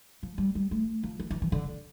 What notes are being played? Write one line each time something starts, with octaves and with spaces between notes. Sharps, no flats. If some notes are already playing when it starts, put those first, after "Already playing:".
F3
G3
G3
A3
F3
E3
E3
E3
D3